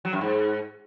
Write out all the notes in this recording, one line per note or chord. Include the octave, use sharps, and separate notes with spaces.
F#3
F#2
G#2